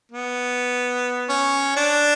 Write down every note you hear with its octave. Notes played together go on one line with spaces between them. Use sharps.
B3
C#4
D4